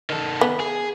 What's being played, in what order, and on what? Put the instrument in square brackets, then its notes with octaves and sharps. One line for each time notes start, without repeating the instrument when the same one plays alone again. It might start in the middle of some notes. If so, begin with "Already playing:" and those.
[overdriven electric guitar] D#3 A4
[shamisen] B3
[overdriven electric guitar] G#4